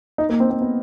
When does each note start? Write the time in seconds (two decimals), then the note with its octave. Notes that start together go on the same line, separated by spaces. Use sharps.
0.18 D#4
0.29 A#3
0.40 C4
0.50 C4
0.61 B3